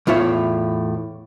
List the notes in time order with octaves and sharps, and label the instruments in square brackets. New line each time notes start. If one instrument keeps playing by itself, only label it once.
[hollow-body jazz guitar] E2 A2 F4 C#5 E5